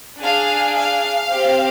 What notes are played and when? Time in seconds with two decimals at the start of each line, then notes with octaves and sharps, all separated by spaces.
0.21 D4 G#4 F5
0.76 F5
1.31 C4 G4